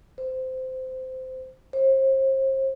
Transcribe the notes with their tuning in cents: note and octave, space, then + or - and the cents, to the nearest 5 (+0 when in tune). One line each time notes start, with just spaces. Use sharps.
C5 -15
C5 +35